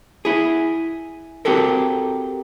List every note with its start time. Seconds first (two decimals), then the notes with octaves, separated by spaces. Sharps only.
0.25 E4 G#4
1.45 C4 F#4 G4 A4 A#4